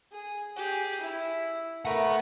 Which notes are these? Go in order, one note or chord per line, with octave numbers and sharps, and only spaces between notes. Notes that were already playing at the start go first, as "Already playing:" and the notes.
G#4
G4 G#4
E4
A3 B3 A#4 F#5